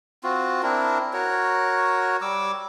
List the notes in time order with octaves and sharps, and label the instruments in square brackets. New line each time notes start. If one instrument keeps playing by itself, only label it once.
[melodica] C4 F4 F#4
C4 D4 E4 A#4
F#4 A#4 C#5
G3 D6 E6